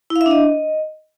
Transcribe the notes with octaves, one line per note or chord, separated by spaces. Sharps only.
E4
F5
E5
D4
D#5